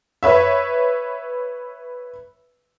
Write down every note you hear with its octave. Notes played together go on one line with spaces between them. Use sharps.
B4 C#5 E5